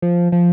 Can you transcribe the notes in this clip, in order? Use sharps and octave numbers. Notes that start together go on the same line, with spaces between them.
F3
F3